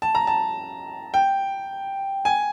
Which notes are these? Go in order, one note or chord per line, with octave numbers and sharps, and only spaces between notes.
A5
A#5
A5
G5
G#5